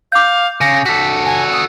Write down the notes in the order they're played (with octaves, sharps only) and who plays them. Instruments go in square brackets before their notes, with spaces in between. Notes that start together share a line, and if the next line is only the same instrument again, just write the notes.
[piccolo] F5 [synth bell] D6 G6
[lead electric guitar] C#3 [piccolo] A#6
[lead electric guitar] F#4 A4 [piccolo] B6
[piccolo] G#5
D#6